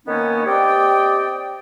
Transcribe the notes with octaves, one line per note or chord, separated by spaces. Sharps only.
D#3 A#3 B3 C#4 D#4
C4 G4 D5 D#5 G5